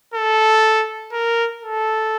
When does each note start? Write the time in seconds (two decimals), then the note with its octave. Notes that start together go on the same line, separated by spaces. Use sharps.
0.14 A4
1.12 A#4
1.62 A4